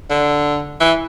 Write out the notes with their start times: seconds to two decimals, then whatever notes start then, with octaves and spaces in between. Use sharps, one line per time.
0.10 D3
0.81 E3